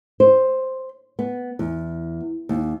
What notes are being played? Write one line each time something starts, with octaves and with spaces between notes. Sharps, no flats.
C5
B3
E2
D#2